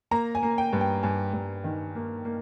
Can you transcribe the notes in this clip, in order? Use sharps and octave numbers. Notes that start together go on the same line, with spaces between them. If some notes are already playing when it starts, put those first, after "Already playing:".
A#3 A#5
G#5
A#3
G5
G2
G5
G2 G#5
G2
D#3
A#3
A#3